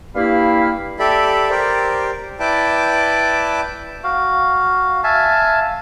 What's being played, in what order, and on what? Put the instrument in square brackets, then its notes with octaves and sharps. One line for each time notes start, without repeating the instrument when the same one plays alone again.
[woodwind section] G2 G3 A#3 E4 F5 B5
[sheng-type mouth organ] G4 A4 D5 E5 B5
G4 A#4 C5 D5
E4 B4 D5 G5 A5 D6
[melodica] F#4 F5
E5 F5 G#5 A5